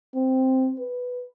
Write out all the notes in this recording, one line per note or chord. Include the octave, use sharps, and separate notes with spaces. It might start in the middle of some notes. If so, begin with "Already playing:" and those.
C4
B4